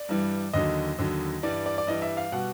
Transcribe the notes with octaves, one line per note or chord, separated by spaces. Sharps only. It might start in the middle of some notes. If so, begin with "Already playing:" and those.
Already playing: D5
G2 E3 G3
D#2 D3 F#3 D#5
D#2 D3 F#3
G2 E3 G3 D5
D5
D5
G2 E3 G3 D#5
E5
F5
B2 G3 F#5